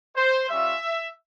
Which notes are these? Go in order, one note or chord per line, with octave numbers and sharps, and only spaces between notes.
C5
G3 C#4 F4 E5